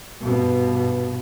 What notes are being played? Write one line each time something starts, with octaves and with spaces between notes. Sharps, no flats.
G2 B2